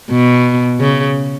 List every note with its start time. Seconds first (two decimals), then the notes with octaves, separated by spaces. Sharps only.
0.11 B2
0.80 C#3